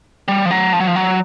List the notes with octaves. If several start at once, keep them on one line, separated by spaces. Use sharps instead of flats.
G3
F3
F#3
F3
F#3
F3
F#3